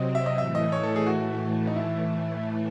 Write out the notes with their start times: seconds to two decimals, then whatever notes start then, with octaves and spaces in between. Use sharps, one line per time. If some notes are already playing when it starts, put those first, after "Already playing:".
Already playing: C3 F#3 C4 D#5
0.15 E5
0.26 D#5
0.38 A2 E3 A3 E5
0.55 D#5
0.72 C#5
0.83 A4
0.96 G#4
1.06 F#4
1.67 D#4
1.76 E4